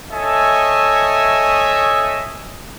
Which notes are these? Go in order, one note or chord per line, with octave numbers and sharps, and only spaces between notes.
A3 A4 C#5 D#5 E5 G#5